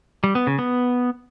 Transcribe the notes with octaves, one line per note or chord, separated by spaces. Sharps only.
G3
B3
C#3
B3